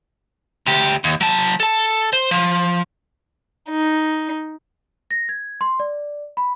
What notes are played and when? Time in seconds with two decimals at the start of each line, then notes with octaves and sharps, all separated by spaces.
0.66 D2 G4
1.04 D#2
1.21 F#3 A5
1.60 A4 A5
2.13 C5
2.31 F3
3.70 D#4
5.11 A#6
5.29 G#6
5.61 C6
5.80 D5
6.37 B5